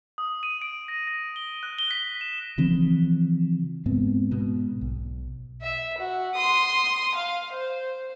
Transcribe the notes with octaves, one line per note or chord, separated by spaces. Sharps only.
D#6
D#7
D7
A#6
A#6
G7
F#6
G7
B6
E7
C#3 E3 F3 C4
G#2 G#3 B3 C4
G#2 B2
B1
E5
F#4
C6 D#6
F5
C5